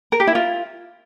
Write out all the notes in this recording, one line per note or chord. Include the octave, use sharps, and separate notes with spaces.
A#4
G4
E4
F4